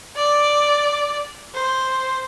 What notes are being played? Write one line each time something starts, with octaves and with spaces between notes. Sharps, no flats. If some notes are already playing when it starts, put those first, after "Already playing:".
D5
C5